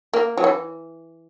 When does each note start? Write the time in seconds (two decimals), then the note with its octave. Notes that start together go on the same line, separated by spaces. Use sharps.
0.14 A#3
0.37 F#3
0.44 E3